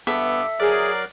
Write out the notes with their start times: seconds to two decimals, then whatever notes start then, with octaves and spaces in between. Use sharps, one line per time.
0.07 G2 B3 A4 E5 D6
0.60 F#3 G#4 A#4 D5 F#6 C7